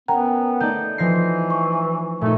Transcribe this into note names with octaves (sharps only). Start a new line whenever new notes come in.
B3 C#4 A#4 F#5 G5 A#5
A3 D#4 D5 G6
E3 F3 A#6 C7
C#6
A#2 A3 D#4